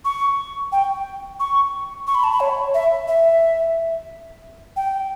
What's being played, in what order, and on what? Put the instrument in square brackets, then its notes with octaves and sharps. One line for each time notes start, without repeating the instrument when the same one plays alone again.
[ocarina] C#6
G5
C#6
C#6
B5
A5
B5
C#5
E5
E5
G5